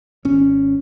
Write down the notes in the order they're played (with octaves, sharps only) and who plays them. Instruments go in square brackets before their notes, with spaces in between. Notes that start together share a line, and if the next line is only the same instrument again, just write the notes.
[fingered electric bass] G#1 C#4